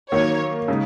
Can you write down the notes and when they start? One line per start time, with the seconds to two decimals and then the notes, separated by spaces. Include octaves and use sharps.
0.12 D#3 F#3 A#3 C#5
0.68 C#3 G#3 D#4